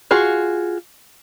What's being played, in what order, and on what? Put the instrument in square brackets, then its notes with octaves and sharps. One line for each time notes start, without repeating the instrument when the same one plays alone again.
[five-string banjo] F4 F#4 G#4